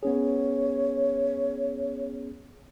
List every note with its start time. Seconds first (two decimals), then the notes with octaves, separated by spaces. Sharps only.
0.03 B3 C#4 G#4 C#5